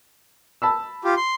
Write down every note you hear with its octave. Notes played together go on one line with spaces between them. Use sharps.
A5 B5 E6
F4 G4
C6